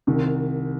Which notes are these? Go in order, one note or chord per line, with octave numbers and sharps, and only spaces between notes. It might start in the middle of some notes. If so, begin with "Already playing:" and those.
C2 C3 D#3